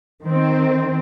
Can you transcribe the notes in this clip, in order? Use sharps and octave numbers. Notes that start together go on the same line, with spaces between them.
D#3 C4